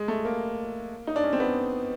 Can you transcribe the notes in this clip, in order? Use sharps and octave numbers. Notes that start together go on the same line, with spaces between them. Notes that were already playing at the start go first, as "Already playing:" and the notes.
Already playing: G#3
A3
A#3
D#4
D4
C#4
C4
B3